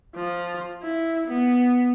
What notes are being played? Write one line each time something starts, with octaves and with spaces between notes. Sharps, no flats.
F3
E4
B3